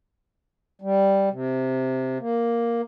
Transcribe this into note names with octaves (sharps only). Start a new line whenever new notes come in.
G3
C3
A#3